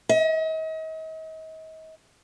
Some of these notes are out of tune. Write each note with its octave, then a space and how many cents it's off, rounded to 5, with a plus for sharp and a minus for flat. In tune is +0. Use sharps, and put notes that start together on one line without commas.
D#5 +40